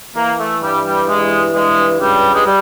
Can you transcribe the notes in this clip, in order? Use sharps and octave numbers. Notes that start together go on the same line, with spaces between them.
E3 A#3
A3
G2 G3
G3
E3 G#3
G2 G#3
C#2 G3
G#3
G3